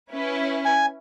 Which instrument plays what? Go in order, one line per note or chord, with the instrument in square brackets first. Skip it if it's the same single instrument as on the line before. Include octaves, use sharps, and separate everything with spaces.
[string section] C#4 E4 B4
[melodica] G#5